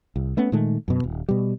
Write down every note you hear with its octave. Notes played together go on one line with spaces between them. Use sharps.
C2
A3 B3 C#4
A#2 D#3 G#3 A3
F#2 B2
D#1
B2 G3